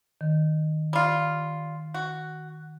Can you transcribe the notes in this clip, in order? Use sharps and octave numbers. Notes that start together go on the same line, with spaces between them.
D#3
G3 F4
F#4